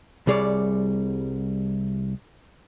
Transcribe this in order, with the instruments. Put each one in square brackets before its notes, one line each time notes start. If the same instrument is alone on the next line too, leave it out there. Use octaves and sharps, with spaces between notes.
[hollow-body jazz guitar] C2 G3 G#4 C#5 D5